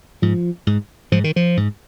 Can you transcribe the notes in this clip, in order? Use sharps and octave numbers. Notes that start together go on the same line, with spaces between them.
G#2 F3
G#2
G#2 F3
D#3
F3
G#2